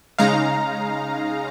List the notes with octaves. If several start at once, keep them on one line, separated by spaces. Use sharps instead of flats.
C#3 G#3 D#4 F5 A#5